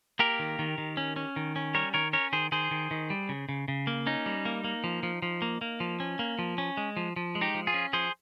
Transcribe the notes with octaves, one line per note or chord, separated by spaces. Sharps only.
A#3 G4 A#4
D#3
D#3
D#3
C#4
C#4
D#3
C#4
G3 A#4 C#5
D#3 A#4 C#5
C#4 A#4 C#5
D#3 G#4 C5
D#3 G#4 C5
D#3
D#3
G3
C#3
C#3
C#3
A#3
C#4 D#4
G3
A#3
A#3
F3
F3
F3
A#3
A#3
F3
C#4
A#3
F3
C#4
G#3
F3
F3
G#3
D#4 G4
F3
F4 G#4
C#4
F3 G#4 C5